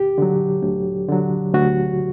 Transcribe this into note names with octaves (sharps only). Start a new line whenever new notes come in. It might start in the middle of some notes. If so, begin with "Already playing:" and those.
Already playing: D2 G4
D3 F#3
D2
D3 F#3
D2 F#4